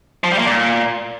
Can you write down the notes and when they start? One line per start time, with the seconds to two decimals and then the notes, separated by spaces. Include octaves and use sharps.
0.24 F3
0.31 G3
0.39 A#3
0.46 A#2